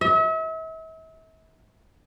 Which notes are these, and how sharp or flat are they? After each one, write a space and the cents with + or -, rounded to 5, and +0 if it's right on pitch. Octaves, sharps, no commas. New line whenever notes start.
E5 -40